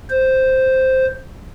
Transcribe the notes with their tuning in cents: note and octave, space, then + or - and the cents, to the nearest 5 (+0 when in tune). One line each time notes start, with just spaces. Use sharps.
C5 +0